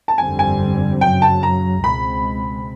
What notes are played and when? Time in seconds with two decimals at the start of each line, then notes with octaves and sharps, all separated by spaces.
0.08 A5
0.18 G1 F2 D3 G3 C4 G#5
0.39 G#5
1.01 F#2 C#3 F#3 G5
1.22 A5
1.43 A#5
1.84 C#2 B2 G#3 C4 B5